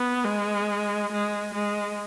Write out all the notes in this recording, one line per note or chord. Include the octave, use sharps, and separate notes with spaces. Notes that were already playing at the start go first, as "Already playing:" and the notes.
Already playing: B3
G#3
G#3
G#3